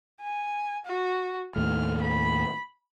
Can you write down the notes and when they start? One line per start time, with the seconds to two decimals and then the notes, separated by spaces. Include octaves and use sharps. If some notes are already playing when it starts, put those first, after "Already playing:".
0.21 G#5
0.85 F#4
1.56 D#2 A2 A3 F6
2.01 B5